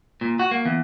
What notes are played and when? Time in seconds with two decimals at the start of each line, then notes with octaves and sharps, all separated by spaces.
0.21 A#2
0.39 F#4
0.51 A#3
0.65 E2